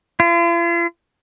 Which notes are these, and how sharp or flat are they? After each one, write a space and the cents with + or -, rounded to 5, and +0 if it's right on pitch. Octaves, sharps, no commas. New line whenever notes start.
F4 -45